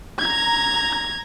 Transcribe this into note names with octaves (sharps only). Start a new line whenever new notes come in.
A#5 G#6